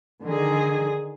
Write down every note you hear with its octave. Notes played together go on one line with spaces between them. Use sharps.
D3 D#3 G#4